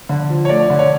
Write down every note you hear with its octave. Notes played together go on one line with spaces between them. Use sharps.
D3
F3
C#5
A3 D5
D3
C#5